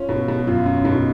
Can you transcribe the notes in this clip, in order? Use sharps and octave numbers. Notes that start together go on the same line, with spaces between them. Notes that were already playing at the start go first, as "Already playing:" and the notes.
Already playing: C#4 F4
B2
B2
F#2 F4
F#2 C#4
B2 D#4